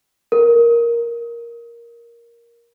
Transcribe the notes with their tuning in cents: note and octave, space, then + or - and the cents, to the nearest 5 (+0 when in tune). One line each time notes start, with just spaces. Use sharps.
A#4 +10